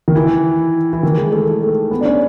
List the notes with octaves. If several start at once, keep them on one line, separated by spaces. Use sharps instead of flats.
D#3
E3
E3
D#3
G#3
A3
A3
B3
D4
C#4